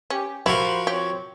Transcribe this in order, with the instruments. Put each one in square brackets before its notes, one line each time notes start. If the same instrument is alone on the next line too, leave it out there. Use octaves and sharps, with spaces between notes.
[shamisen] C#4 [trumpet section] G4
[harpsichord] F3 F#4 A#4 [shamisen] E4 [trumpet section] G4 C5 B5
[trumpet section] C4 C#5 [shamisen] G4